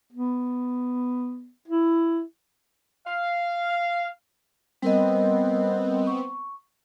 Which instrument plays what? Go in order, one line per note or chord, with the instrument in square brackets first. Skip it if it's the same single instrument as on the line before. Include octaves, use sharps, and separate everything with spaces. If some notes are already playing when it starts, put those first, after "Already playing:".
[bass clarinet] B3
E4
[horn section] F5
[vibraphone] G3 A#4 D#5 [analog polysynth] B3 C4
[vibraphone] C#6